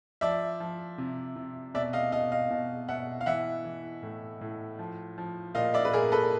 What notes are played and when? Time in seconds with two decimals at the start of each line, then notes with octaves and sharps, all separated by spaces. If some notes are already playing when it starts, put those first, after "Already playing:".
0.21 F3 D5 E5
0.60 F3
0.98 C3
1.36 C3
1.74 B2 D5 E5
1.93 D#5 F5
2.12 B2 D#5 F5
2.32 D#5 F5
2.50 B2
2.89 B2 E5 F#5
3.21 F5
3.26 E3 E5 F#5
3.64 E3
4.03 A2
4.41 A2
4.79 F3
5.18 F3
5.55 A#2 D#5 F5
5.74 D5 E5
5.85 B4
5.93 A#2 G#4 A#4
6.12 A4 B4